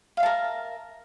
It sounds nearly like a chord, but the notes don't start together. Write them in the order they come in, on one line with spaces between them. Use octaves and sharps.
F5 E5 A5 A#4